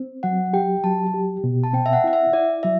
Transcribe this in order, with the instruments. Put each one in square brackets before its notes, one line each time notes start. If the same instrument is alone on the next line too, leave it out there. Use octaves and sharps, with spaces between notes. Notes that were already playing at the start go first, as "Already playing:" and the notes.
Already playing: [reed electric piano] C4
[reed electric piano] F#3 [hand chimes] F#5
[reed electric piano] G4 [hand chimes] G5
[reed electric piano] F#3 [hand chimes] A5
[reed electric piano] G4
B2
[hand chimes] A5
[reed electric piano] C4 [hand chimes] G5
[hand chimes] E5
F#5
[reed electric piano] E4 [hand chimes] F#5
[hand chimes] E5
[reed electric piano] E4 [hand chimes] D5
[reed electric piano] F#3 [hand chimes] E5